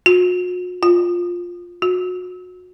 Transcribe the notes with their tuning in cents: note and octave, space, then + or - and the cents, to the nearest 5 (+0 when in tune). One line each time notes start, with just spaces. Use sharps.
F#4 -45
F4 +10
F#4 -30